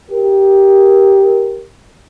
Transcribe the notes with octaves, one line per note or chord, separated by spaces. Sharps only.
G4 A#4